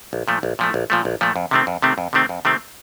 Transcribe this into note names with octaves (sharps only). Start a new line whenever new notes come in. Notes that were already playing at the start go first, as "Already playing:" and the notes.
A#1
A#2 F3 A3
A#1
A#2 F3 A3
A#1
A#2 F3 A3
A#1
A#2 F3 A3
F2
C3 D#3 A3 C4
F2
C3 D#3 A3 C4
F2
C3 D#3 A3 C4
F2
C3 D#3 A3 C4